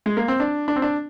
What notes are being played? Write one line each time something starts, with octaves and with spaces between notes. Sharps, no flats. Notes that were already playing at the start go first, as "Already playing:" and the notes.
G#3
A#3
C4
D4
D4
C4
D4